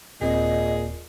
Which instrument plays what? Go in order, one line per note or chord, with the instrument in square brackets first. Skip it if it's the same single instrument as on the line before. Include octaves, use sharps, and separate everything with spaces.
[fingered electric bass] D#1 C4 [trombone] A#2 [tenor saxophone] G#4 [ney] D#5